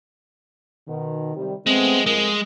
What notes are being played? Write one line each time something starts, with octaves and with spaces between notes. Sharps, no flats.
B2 D#3
C3 D#3 G3
G#3 A3 B3 C4
F2 G#3 A#4